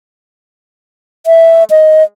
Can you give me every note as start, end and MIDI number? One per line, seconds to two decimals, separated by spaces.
1.27 1.64 76
1.70 2.03 75